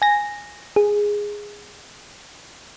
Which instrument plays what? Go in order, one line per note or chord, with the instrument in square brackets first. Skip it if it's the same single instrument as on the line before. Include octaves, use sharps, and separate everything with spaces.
[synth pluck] G#5 A#6
G#4